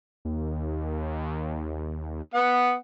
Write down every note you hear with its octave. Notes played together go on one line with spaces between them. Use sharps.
D#2
B3 F#5